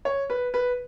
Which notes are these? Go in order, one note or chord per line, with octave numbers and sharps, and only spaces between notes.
C#5
B4
B4